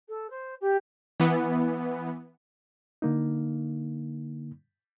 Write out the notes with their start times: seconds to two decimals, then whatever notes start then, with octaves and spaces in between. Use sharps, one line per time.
0.08 A4
0.30 C5
0.61 G4
1.20 E3 B3
3.02 D3 A#3 D#4